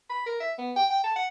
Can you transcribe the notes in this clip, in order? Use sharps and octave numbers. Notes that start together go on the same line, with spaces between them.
B5
A#4
E5
B3
G5
G5
A5
F#5